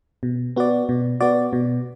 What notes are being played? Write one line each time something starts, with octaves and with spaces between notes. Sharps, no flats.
B2
B3 F#4 D5
B2
B3 F#4 D5
B2